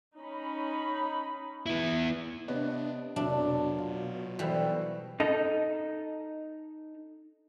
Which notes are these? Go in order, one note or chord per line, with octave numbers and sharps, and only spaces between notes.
C#4 D#4 B5
B3 E4
C3 B3 D4 C#5 D#5
F1 C2 B2 F#3 D4 E5
F4
E3 G3 F#4 A4 C5
D#4 A4